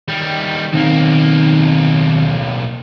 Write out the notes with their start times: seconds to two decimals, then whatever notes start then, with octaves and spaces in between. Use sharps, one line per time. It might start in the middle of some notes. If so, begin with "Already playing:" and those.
0.08 D#3 G3
0.73 B1 D#3 A#3 C4 D#4